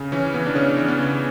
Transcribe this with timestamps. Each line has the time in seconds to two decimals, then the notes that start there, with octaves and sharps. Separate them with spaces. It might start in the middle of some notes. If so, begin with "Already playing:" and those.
Already playing: C#3
0.12 E3 C#4
0.34 E3 B3
0.47 D4
0.55 C#3 C#4
0.78 E3
0.88 B3
0.99 C#3